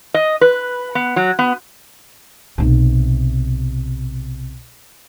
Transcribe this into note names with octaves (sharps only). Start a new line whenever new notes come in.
D#5
B4
B3
F#3
B3
B1 C3